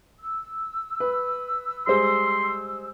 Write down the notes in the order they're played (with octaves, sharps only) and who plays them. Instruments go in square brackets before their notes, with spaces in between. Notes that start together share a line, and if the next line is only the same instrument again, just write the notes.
[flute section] E6
[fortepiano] B4
[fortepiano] G3 G#3 C5 [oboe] C6